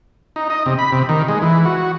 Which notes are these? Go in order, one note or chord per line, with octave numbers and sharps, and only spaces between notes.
D#4
D#5
C3
B5
C3
D#3
G#3
E3
F#4